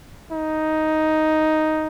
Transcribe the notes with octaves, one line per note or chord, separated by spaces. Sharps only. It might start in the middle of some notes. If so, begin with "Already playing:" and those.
D#4